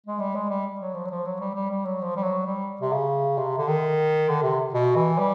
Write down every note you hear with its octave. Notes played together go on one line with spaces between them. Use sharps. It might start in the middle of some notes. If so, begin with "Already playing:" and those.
G#3
G3
G#3
G3
F#3
F3
F#3
F3
F#3
G3
G3
G3
F#3
F3
G3
F#3
G3
C3
C#3
C3
D3
D#3
D3
C3
B2
E3
G3